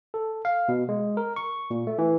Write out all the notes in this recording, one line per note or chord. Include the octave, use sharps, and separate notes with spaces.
A4
F5
B2
G#3
A#4
C#6
A#2
A3
E3